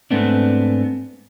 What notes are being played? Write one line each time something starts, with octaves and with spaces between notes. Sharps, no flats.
G#2 A3 B3 C4 D4